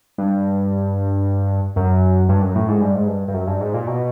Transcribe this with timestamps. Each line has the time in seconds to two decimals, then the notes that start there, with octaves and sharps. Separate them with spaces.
0.18 G2
1.76 F#2
2.29 G2
2.42 F#2
2.55 A2
2.68 G#2
2.81 G2
2.95 G#2
3.07 G2
3.28 G2
3.34 F#2
3.47 G2
3.61 G#2
3.74 A#2
3.87 B2